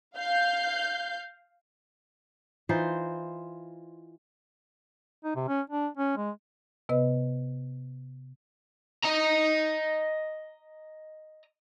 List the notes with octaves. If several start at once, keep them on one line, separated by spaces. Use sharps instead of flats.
F5 G6
E3 D#4 F4 C5
D#4
C3
C#4
D4
C#4
G#3
C3 B3 B4 D#5
D#5 A#5